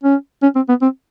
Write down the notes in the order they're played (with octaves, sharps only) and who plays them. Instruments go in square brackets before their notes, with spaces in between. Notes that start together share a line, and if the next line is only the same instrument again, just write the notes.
[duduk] C#4
C#4
C4
B3
C4